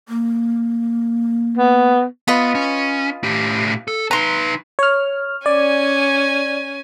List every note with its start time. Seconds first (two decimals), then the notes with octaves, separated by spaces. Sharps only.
0.09 A#3
1.57 B3
2.28 B3 F4 B4 D#5
2.55 C#4
3.23 A2 G4
3.88 A4
4.11 D#4 B4 A#5 C6
4.79 C#5 F6
5.46 C#4 D5 G#5